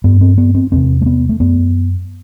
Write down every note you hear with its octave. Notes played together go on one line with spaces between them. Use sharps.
G2 B3
C4
B3
C4
E2 C3 C4
A3
B3
A3
F#2 B3